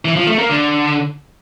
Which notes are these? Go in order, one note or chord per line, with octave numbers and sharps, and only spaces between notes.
E3
F3
A3
A#3
D3